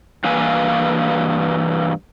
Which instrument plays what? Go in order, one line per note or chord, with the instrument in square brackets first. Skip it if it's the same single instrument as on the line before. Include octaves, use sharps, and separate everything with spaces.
[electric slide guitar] G2 E3 A#3 B4 F5 G#5